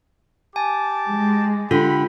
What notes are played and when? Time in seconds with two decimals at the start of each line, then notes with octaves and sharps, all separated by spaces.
0.56 G4 G#5 A5 D6
1.09 G#3
1.71 D3 F4 G4 B5